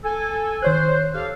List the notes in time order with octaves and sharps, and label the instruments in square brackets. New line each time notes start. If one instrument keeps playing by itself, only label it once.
[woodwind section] A4 G#5
[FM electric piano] D#3 C#5 F#6 [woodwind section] C5
[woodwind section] G4 A4 F5